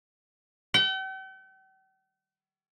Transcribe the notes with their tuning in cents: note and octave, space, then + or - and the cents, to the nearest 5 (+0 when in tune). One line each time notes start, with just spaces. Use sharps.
G5 -45